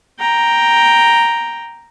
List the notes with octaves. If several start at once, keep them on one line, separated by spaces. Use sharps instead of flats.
G5 A#5